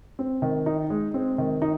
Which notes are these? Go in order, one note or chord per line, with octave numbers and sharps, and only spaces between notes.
C4
D#3
D#4
G#3
C4
D#3
D#4